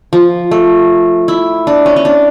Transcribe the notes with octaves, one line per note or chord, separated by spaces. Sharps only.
F3
A3
E4
D4
C#4
C#4
D4